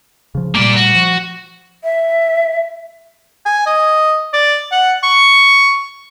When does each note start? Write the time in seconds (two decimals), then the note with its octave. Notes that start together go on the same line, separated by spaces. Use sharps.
0.35 C#3 F3
0.55 A#2 G3 A3 A#3 D5
0.76 F#4
0.95 F3
1.84 E5
3.46 G#5
3.67 D#5
4.34 D5
4.72 F#5
5.04 C#6